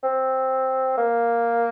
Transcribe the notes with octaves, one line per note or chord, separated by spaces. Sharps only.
C4
A#3